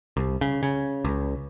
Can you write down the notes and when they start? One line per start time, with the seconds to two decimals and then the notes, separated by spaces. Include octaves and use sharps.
0.17 C2
0.41 C#3
0.63 C#3
1.05 C#2